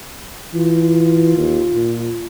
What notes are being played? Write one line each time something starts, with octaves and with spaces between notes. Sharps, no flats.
E3 F4
D#2
A#2